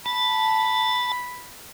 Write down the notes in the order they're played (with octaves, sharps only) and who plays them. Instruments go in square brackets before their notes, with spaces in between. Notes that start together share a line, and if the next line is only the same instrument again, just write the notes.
[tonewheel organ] A5 [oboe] B5